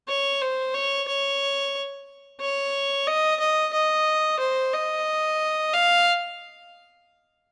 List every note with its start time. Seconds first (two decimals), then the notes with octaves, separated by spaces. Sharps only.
0.08 C#5
0.41 C5
0.74 C#5
1.08 C#5
2.41 C#5
3.07 D#5
3.40 D#5
3.73 D#5
4.39 C5
4.73 D#5
5.73 F5